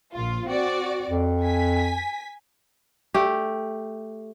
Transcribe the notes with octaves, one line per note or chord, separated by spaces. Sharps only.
A#1 F4
C4 F#4 D5
F2
G#5 B6
A3 G4